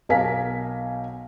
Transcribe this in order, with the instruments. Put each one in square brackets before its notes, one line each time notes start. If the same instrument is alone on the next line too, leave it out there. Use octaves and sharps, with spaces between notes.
[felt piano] B1 A#4 F5 G#5 B6